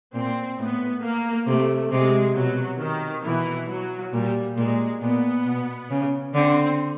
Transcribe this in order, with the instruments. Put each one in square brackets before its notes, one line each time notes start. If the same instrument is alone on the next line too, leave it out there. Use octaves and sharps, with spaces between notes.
[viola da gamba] A#2 [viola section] C4
[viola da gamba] A2 [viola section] B3
[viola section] A#3
[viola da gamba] C3 [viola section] A3
[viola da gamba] C3 [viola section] G#3
[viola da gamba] B2 [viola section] F#3
[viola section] D#3
[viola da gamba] B2 [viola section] E3
[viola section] F#3
[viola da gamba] A#2 [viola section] G3
[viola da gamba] A#2 [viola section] G#3
[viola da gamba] A#2 [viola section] B3
[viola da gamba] B2
C#3
[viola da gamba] D3 [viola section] C4